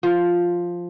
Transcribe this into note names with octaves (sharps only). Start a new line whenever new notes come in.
F3